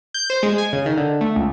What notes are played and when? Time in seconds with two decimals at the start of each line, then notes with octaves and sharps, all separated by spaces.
0.14 G6
0.30 C5
0.43 G#3
0.58 G#5
0.73 C#3
0.86 D#3
0.97 D3
1.21 A3
1.36 C#2